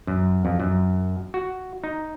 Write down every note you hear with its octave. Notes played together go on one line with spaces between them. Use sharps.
F#2
F2
F#2
F#4
D#4